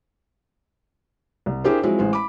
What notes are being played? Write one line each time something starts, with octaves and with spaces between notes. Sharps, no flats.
C2
D4 E4 G4 G#4 A#4 C5
F3 F#3 G#3 C4 E4
A1 G#3 C5
B5 D6